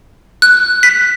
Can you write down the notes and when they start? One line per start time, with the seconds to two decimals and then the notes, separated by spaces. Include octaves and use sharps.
0.42 F#6
0.83 B6